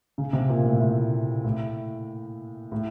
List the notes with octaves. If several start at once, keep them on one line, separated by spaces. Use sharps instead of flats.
C#3
C3
A#2
A2
A2
A2
A2